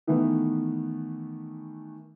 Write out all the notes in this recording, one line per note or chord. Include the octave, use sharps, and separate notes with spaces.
D#3 E3 A3 B3